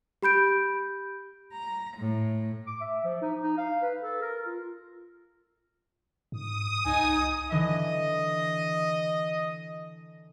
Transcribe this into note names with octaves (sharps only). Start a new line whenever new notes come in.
G4 B5 G6 D7
A#5
A2
D6
E5
F3
D#4
D#4
F5
B4
A4
A#4
F4
G#2 D#6
C2 D#4 G#5
D3 E3 D#5